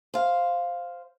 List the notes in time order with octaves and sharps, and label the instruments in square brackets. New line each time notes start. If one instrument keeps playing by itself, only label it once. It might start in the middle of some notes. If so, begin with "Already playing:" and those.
[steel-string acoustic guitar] C5 F5